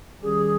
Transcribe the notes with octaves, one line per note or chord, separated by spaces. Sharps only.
D#3 G3 C#4 G4 G#4